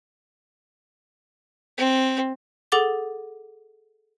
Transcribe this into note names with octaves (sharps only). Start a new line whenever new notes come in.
C4
G#4 A4 F#5 D6 A6 G7